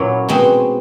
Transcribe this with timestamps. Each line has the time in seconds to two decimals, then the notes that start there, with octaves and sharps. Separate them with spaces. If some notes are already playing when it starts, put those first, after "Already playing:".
Already playing: A#2 F#3 A#3 C#4 E4
0.29 B2 G#3 C4